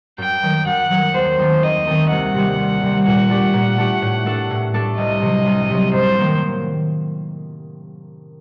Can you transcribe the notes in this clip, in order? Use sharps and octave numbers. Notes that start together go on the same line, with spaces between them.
F#2 G5
D#3 F#3
F#2 F#5
D#3 F#3
D#2 C5
D#3 A3 C4 D#4
D#2 D#5
D#3 A3 C4 D#4
C2 F#5
C3 G3
C2
C3 G3
A#2 F#5
A3 D4 G4
A#2
A3 D4 G4
A2
A3 D4 A4
A2
A3 D4 A4
C2 D#5
C3 F#3
C2
C3 F#3
F#2 C5
D#3 F#3 A#3